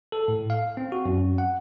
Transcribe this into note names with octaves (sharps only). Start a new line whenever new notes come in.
A4
A2
F5
C4
F#4
F#2
F#5